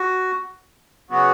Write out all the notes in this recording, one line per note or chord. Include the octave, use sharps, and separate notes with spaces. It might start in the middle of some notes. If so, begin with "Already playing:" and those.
Already playing: F#4
C#3 F#3 B3 F#4